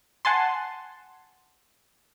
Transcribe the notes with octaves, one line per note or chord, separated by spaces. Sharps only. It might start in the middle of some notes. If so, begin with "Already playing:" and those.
F#5 G#5 A5 C6